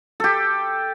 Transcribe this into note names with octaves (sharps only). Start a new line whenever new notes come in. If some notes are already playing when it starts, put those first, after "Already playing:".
G4 A4